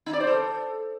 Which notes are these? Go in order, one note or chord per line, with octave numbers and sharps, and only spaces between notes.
D#4
D5
C5
A4